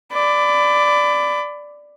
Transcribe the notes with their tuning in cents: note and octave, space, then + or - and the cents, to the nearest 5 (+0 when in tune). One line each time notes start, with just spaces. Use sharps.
D5 +0 B5 +25